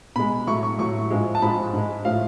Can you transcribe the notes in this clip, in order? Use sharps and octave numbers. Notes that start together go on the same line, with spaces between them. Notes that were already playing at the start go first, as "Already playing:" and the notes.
B2 G#3 B5
A2 F#3 A3 C#6
C#6
A2 F#3 A3 C#6
G#2 F3 G#3
A5
G#2 F3 G#3 B5
G#2 G#3
A2 F3 A3 F5